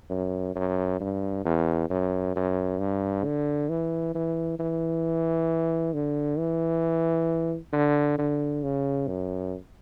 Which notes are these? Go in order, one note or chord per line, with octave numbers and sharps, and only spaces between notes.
F#2
F#2
G2
E2
F#2
F#2
G2
D3
E3
E3
E3
D3
E3
D3
D3
C#3
F#2